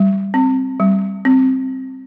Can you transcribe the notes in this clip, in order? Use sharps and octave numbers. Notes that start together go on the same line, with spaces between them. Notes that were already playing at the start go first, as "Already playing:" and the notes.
Already playing: G3
C4
G3
C4